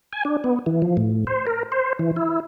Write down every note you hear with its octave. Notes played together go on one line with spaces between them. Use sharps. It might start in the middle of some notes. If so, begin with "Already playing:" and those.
G#5
D4
B3
E3
F3
A2
C5
A#4
C5
E3
E4